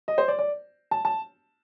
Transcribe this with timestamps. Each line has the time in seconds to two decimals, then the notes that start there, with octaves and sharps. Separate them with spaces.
0.08 D#5
0.18 C5
0.28 D5
0.39 D5
0.91 A5
1.05 A5